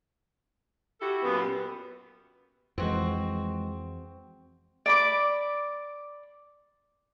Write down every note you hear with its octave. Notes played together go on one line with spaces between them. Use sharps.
E4 F#4 G4 A4
F#2 A#2 B3
F2 E3 G#3 C4 F#4
D5 B5 D6